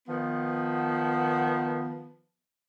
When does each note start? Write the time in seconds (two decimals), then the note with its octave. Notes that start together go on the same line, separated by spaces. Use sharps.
0.08 D#3 F3 B3